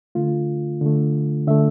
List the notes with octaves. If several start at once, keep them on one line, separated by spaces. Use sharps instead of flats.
D3 A3 F4
D3 A3
D3 A3 E5